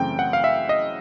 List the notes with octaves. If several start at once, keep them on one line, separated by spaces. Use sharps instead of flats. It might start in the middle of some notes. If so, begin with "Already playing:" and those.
Already playing: F#2 C#3 E3 A3 C4 G5
F#5
F5
E5
D#5